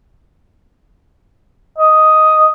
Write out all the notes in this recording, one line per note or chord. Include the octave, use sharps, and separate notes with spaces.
D#5